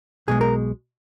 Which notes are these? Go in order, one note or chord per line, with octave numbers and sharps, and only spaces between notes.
B1 B2 G#3 G#4
A#4